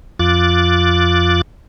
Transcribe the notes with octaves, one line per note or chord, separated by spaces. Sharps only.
F2 F4 D6 F#6 A6